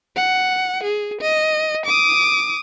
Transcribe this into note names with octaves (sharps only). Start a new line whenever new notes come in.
F#5
G#4
D#5
D6 D#6